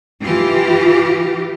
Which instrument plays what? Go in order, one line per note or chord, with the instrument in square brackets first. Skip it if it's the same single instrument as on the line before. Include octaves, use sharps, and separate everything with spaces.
[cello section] E3 F4 G4